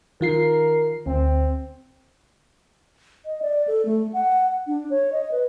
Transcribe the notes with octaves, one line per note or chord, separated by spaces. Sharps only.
D#3 F4 A#4 C7
D2 C4
D#5
D5
A4
A3
F#5
D4
C#5
D#5
B4